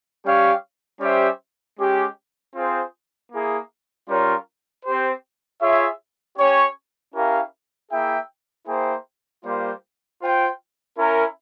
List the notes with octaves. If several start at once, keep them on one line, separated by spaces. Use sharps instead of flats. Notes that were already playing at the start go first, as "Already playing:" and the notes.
G3 C#4 G4 C#5 F5
G3 C#4 G4 C5 E5
G#3 C#4 G4
C4 F4 G#4 C5
A#3 E4 G#4
G3 C#4 F4 A#4 C#5
C4 G4 C5
F4 G#4 C#5 E5
C#4 G4 C#5
C#4 E4 G4 A#4 F5
A#3 E4 G#4 E5 G5
A#3 E4 G#4 C5 G5
G3 A#3 F4 C5
F4 C5 G5
C#4 E4 A#4